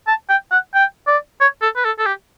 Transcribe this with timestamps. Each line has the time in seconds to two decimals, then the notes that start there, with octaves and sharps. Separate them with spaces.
0.07 A5
0.29 G5
0.51 F#5
0.74 G5
1.07 D5
1.40 C#5
1.62 A4
1.76 B4
1.85 A4
1.99 A4
2.06 G4